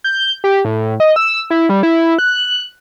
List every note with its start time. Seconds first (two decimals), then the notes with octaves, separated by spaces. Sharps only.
0.04 G6
0.44 G4
0.65 A2
1.00 D#5
1.16 E6
1.50 E4
1.69 G3
1.83 E4
2.19 F#6